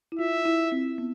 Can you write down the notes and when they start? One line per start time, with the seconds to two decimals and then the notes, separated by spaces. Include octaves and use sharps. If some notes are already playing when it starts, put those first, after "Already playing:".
0.12 E4
0.19 F4 E5
0.45 E4
0.72 C4
0.98 B3